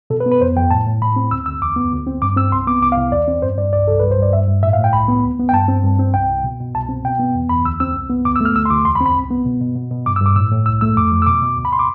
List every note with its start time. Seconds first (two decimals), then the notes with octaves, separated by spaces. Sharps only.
0.10 B2 A4
0.20 B4
0.26 B3
0.32 B4
0.41 F2 C5
0.56 F2 G5
0.71 A2 A5
0.86 A2
1.02 A2 B5
1.16 C4
1.31 D2 E6
1.46 D2 E6
1.61 E2 D6
1.76 B3
1.92 D2
2.07 C4
2.22 G2 D6
2.37 C4 E6
2.52 C2 C6
2.67 B3 D6
2.82 C2 D6
2.92 F5
2.98 C2
3.12 E2 D5
3.28 C4
3.42 G2 C5
3.58 G2 D5
3.72 C2 D5
3.88 C2 A4
4.00 G2 B4
4.11 C5
4.18 G2 D5
4.33 G2 E5
4.48 G2
4.63 A2 E5
4.73 F5
4.78 A2
4.84 G5
4.93 C2 B5
5.08 B3
5.23 D2
5.39 B3
5.49 G5
5.53 G2 A5
5.68 C4
5.83 G2
5.99 C4
6.14 C2 G5
6.30 C2
6.44 B2
6.60 B2
6.75 C2 A5
6.89 C4
7.05 B2 G5
7.19 B3
7.34 E2
7.49 E2 B5
7.65 D2 E6
7.80 C4 E6
7.95 C2
8.10 B3
8.25 D2 D6
8.36 E6
8.41 A3 F6
8.56 D2 E6
8.65 C6
8.70 D2 D6
8.85 E2 C6
8.95 B5
9.01 C4
9.06 B5
9.15 C2
9.31 B3
9.45 B2
9.61 B2
9.76 B2
9.91 B2
10.06 G2 D6
10.16 E6
10.21 G2 D6
10.36 A2 E6
10.52 A2
10.66 C2 E6
10.81 A3 E6
10.97 F2 D6
11.12 F2
11.22 E6
11.26 B2 D6
11.42 B2
11.57 D2
11.65 B5
11.73 C6
11.79 D6